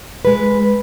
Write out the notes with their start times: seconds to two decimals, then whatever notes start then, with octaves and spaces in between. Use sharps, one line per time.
0.25 G#3 B4